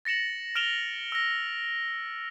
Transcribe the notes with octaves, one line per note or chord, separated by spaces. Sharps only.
A6 A#6 C#7 E7 F#7
F6 D7 E7 F7 G7
E6 A#6